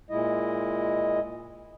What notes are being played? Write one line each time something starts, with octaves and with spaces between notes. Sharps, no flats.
A#2 G#3 E4 D#5